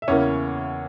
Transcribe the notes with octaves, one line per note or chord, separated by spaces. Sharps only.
E5
E2 C#3 E3 A#3 C#4 C#5